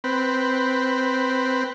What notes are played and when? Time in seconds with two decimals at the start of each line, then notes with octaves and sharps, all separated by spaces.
0.04 C4 B4